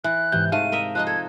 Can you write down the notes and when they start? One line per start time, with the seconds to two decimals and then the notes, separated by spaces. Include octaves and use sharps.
0.04 E3 F#6
0.32 G#2 C3 E3 G6
0.52 G#2 A3 F5 D#7
0.72 A#4 D#5 E5
0.95 F3 D#4 D#5 F#6
1.07 A4 G#6